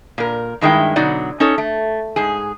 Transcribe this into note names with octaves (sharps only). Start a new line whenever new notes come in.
A#2 A#4
G2 D#3 G#3 E4 G5
B2 D3 F#3 D#4 D5 F#5
C#4 D#4 A4 C#5
A3
G#2 G#4